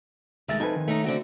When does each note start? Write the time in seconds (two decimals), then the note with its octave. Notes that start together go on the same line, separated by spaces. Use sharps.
0.48 C2 D#3 G#3 A3 E5 A6
0.60 F2 D#4 A4 B4 G#5
0.76 D#3
0.88 A3 C#4 D#4
1.04 D3 C4 F#4